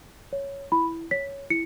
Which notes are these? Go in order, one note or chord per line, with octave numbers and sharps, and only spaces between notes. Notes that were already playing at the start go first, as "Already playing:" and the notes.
C#5
E4 B5
C#5 B6
E4 C#7